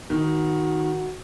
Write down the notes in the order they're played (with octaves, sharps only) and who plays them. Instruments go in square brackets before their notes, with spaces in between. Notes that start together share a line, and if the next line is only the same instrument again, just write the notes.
[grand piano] D#3 [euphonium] F#4